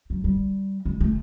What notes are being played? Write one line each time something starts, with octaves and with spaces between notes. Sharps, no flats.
F#3
G3
G#3
A3